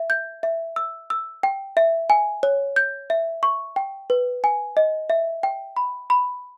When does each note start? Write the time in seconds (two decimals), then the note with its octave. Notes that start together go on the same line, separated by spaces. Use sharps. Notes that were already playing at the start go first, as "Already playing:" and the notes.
Already playing: E5
0.10 G6
0.43 E5
0.76 E6
1.10 E6
1.43 G5
1.77 E5
2.10 G#5
2.43 C#5
2.76 G6
3.10 E5
3.43 C#6
3.76 G5
4.10 B4
4.44 G#5
4.77 D#5
5.10 E5
5.43 G5
5.77 B5
6.10 B5